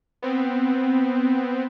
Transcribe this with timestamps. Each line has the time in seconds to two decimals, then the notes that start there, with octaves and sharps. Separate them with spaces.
0.22 B3 C4